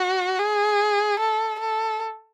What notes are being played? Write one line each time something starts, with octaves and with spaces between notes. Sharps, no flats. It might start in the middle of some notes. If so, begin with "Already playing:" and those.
Already playing: F#4
G#4
A4
A4